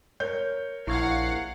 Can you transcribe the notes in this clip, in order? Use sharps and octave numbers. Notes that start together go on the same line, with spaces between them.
A#4 C#5 G6
A#1 E4 F5 F#5 C#6 G#6